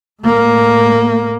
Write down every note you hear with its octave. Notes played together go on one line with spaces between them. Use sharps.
A2 A#3